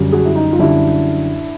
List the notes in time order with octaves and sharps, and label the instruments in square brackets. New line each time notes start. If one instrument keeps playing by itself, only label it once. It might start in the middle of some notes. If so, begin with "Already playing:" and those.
Already playing: [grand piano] F#2 D3 G3
F#4 G#4
E4
D#4
F4
F#2 D3 G3 D4 E4